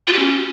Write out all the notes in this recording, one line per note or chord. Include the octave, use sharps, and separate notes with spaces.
F4
G4
C#4